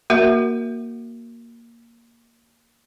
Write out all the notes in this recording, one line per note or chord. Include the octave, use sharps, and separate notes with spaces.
A#3 F#4 A#4 E5